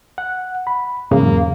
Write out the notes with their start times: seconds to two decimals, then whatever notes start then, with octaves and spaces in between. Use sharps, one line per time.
0.18 F#5
0.67 B5
1.11 E2 G#2 C#3 F#3 A#3